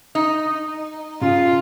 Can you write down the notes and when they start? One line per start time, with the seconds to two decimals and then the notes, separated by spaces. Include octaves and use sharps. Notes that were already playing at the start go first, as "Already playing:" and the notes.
0.15 D#4
1.21 C#3 F4